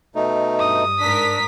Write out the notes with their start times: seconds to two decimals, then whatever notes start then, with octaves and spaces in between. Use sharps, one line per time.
0.15 B2 A3 D#4
0.59 G2 D#6
1.00 G#2 D4 A#4 B6